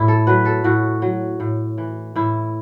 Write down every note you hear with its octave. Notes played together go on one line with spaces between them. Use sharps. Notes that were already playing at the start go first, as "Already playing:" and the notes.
Already playing: A2 E4
A4
F#3 B4
A4
A2 F#4
F#3
A2
E3
A2 E4